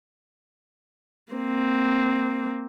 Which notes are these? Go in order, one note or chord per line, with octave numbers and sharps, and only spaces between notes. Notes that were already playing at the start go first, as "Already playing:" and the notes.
A#3 C4